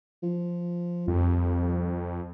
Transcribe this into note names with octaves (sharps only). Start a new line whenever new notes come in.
F3
C2 F2